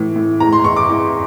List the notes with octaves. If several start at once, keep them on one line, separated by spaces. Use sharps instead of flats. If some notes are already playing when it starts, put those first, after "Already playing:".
Already playing: A2 E3
A2
E2 A#5
C6
E2 C#6
D6
E2